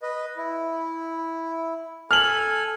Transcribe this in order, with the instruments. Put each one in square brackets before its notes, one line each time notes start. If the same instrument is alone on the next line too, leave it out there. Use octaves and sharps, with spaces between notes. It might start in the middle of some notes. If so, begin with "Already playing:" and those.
[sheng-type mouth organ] B4 D#5
E4
[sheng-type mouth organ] A4 G#5 [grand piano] F6 F7 F#7